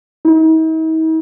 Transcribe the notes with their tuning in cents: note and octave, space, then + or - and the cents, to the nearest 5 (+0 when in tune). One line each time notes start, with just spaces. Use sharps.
D#4 +45